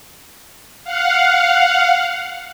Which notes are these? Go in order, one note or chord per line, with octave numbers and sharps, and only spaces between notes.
F5 F#5